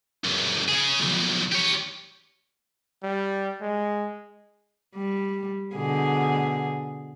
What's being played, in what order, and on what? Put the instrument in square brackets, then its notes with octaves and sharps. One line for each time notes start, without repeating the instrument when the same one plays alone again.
[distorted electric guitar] C#2 F#2
C#3 G#4
B1 F2
G4 C#5
[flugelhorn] G3
G#3
[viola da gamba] G3
B2 D3 G#4